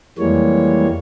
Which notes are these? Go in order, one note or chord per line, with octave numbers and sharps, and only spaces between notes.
F2 E3 G3 G#3 A#3 C#5